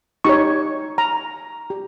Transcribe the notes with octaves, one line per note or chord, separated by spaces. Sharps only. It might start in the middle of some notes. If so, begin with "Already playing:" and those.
D#4 G4 C#5 C#6
A#5
G4